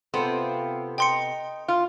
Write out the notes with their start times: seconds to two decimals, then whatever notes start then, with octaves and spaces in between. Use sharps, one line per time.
0.14 C3 B3 C4 F4 A4
0.98 D#4 G5 C6 C#7
1.68 F4